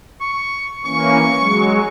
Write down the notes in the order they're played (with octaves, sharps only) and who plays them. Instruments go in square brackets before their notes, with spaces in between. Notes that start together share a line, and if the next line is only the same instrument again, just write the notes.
[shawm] C#6
[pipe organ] E3 A#3 C#4 [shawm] C#6
[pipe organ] F#3 G#3